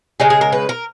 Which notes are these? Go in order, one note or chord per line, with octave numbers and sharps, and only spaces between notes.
C#3 G#3 G#4
G#4
A#4
B4
A#4